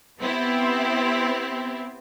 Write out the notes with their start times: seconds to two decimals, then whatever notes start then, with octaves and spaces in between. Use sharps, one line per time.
0.20 B3 C4 E4 G4